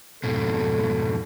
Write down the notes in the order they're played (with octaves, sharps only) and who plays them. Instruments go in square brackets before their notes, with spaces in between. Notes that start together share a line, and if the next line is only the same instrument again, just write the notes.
[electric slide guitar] F2 G#2 B2 [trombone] A4